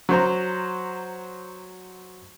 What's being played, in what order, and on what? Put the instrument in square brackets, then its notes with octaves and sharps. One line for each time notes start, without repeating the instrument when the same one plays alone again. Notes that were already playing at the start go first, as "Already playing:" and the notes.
[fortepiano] F#3 C5 A#5